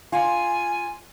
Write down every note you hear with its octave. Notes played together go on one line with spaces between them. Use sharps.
F4 G#5